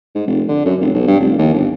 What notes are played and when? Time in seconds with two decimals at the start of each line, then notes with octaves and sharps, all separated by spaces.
0.15 G#2
0.27 F1
0.48 D3
0.66 F#2
0.80 F1
0.95 B1
1.07 G2
1.20 F1
1.38 D#2
1.54 G1